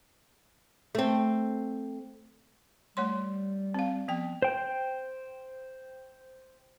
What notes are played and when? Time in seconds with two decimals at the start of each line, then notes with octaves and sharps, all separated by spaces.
0.95 A3 C4
2.97 G3 A3 C#5 C6
3.74 C4 F5
4.08 F3 B3 G5
4.42 C5 G5